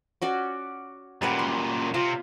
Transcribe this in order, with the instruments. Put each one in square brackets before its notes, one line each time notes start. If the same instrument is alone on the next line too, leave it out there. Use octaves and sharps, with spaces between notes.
[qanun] C#4 F#4 D5
[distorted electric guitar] F#2 A#2 [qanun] G3 B4 F#5
[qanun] C6
[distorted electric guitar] C3 [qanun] F4